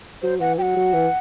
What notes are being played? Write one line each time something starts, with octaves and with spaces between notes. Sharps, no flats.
F#3 C5
E3 F#5
F#3 F#5 G5
F#3
E3